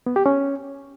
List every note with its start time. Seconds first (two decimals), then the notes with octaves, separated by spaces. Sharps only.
0.06 B3
0.16 G4
0.26 C#4